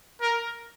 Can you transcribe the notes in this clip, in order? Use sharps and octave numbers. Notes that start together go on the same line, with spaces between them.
A#4